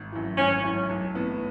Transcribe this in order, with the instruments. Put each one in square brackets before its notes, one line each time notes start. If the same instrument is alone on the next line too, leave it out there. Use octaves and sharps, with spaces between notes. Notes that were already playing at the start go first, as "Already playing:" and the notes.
Already playing: [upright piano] G#1
F#2 E3
[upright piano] G#1 [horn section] C#4
[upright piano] F#2 E3
B1
A2 E3 B3